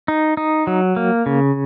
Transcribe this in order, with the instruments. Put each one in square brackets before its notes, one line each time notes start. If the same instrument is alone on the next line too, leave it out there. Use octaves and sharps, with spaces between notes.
[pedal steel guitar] D#4
D#4
F#3
A#3
C#3